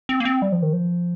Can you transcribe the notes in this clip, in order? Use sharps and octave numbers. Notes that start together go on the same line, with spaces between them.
C4
A#3
C4
G3
F3
D#3
F3